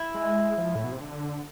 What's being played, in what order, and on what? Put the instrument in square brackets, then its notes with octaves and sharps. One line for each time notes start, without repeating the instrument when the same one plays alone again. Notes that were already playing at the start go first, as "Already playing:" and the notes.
Already playing: [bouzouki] E4
[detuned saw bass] G#3
F3
A2
B2
C3
D3